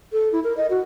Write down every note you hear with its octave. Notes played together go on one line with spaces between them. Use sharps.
A4
E4
A#4
D#5
F#4